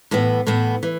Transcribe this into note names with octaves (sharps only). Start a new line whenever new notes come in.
A2 E3 B3
A2 E3 B3
E3